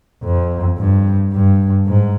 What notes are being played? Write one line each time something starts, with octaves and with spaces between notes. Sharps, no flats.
F2
G2
G2
G#2